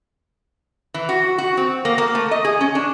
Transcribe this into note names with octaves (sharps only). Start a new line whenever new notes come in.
E3
F#4
F#4
C4
A#3
A#3
A3
D#5
G#4
C#4
D4